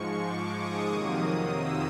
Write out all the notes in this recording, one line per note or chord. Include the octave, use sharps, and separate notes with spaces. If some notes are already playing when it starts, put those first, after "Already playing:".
Already playing: G#2 F3 G#3 C#6
D6
D#6
F2 C3 D#3 F#3 A#3
E6